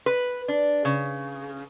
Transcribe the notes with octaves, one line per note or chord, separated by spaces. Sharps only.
B4
D4
C#3